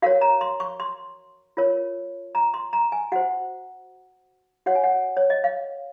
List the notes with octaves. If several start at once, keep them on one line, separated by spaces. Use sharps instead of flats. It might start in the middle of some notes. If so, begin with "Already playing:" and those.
F#4 A#4 C#5 F5
A#5
C6
C#6
C6
F4 A#4 C#5
A#5
C6
A#5
G#5
F#4 C5 F#5
F#4 C#5 F#5
G#5
F#5
C#5
D#5
F5